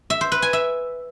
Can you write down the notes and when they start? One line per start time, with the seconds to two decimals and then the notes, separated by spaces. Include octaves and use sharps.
0.10 E5
0.21 C5
0.32 B4
0.42 G#5
0.53 E5